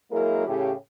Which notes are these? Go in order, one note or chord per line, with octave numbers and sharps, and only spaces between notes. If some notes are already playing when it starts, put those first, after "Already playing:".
F#3 G#3 A#3 E4 G#4 A#4
A2 C#3 G4